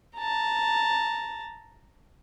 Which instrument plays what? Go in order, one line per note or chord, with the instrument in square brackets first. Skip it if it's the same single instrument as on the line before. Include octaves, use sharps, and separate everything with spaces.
[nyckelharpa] A5 A#5